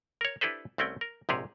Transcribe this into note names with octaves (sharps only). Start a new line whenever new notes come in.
A#4 C#5
D4 E4 G4 A4 B4 C5
C2 A3 C4 C#4 G5
A#4
A#1 G#2 C3 G4 G#4 C#5